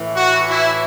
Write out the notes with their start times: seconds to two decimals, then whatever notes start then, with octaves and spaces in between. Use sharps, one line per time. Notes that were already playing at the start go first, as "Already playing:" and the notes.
Already playing: A2 E3
0.16 F#4
0.48 E4